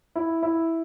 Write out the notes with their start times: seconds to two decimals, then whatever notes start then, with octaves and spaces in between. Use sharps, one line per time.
0.16 E4
0.43 E4